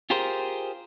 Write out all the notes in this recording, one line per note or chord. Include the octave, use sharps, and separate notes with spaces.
F4 G4 G#4 A#4 C5